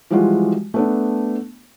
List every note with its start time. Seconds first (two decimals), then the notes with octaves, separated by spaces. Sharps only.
0.11 E3 F3 G3 G#3 F4 F#4
0.74 A3 B3 D4